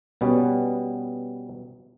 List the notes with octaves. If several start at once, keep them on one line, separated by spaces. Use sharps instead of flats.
B2 G3 B3 C#4